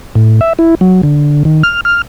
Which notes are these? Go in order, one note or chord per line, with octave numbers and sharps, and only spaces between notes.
A2
E5
E4
F#3
D3
D#3
F6
F6